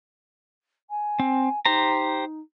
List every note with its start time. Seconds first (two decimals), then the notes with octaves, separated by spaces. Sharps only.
0.89 G#5
1.20 C4
1.65 D#4 G4 C5 A#5